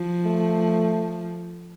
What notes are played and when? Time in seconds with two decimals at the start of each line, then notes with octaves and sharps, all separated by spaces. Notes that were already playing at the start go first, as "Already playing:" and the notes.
Already playing: F3
0.25 A3